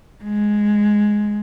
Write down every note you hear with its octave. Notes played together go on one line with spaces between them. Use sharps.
G#3